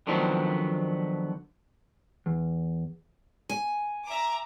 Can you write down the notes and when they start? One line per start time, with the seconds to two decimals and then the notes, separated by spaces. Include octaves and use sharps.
0.07 D3 D#3 F3 F#3 B3 C4
2.26 E2
3.49 G#5
4.07 E5 A#5 D6